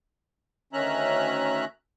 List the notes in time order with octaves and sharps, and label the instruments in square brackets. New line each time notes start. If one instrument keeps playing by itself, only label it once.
[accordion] D2 D#3 C#4 E5 A#5 F#6